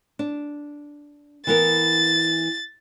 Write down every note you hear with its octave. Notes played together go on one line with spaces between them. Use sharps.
D4
E3 B3 A#4 A6